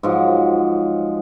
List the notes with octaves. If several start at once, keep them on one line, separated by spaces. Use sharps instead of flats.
G#2 F3 F#3